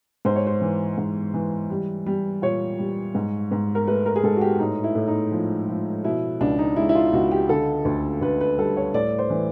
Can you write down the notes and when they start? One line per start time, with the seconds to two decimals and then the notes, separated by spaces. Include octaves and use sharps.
0.25 G#2 C5
0.36 C#5
0.47 C5
0.61 E3
0.98 G#2
1.34 E3
1.70 G3
2.06 G3
2.42 A#2 C#5
2.79 G3
3.15 G#2
3.52 G#2
3.75 A#4
3.87 A3 B4
4.06 A#4
4.16 G#4
4.24 G#2 A4
4.37 F#4
4.41 G4
4.59 A2 D#4
4.84 E4
4.95 A2
5.07 D#4
5.32 F3
5.69 F3
6.04 B2 E4
6.41 C#2 D4
6.59 D#4
6.76 G#3 E4
6.89 E4
6.95 F4
7.13 C#2 F#4
7.31 G4
7.49 D3 A4
7.85 D2
8.21 D2 B4
8.41 B4
8.58 G3 A4
8.77 C#5
8.94 A2 D5
9.19 C5
9.30 E3